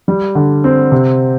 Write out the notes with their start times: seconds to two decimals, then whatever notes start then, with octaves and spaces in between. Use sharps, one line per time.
0.08 G3
0.35 D3
0.64 C4
0.92 C3